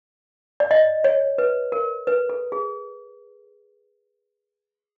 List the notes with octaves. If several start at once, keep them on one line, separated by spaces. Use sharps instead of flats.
D5
D#5
C#5
B4
A#4
B4
A4
G#4